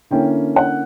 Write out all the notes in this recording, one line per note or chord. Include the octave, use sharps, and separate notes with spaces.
D3 A#3 C#4 E4 G5
F#5